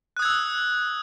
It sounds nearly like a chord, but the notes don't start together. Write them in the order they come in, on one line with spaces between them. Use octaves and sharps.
F#6 D#6 G#6 E6